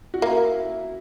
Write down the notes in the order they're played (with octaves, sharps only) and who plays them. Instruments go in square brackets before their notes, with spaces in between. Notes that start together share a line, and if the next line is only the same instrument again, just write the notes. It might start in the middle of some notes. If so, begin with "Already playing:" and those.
[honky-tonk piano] F#4
[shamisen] A#3 [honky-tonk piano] E4